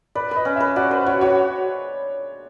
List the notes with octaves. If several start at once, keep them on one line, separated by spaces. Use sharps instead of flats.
B4 D5
B4
D#5
C#4
B4 E5
F#4 D5
B4 C5
F#4 C#5
F#4 C#5